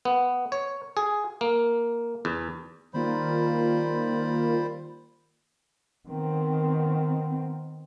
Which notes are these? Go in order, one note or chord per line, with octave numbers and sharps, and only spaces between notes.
B3
C#5
G#4
A#3
E2
D#3 G3 A#3 F4 C5 B5
D#3 B3 C4